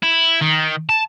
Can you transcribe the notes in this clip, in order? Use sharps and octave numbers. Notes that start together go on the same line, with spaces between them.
E4
D#3
A5